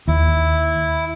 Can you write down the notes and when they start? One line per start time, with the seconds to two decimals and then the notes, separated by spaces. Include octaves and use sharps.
0.08 D#2 E4